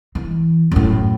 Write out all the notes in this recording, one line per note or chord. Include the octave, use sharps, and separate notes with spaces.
E3
F#2 A2